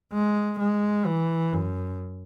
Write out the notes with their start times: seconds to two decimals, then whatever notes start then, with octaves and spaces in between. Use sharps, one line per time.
0.13 G#3
0.59 G#3
1.06 E3
1.53 F#2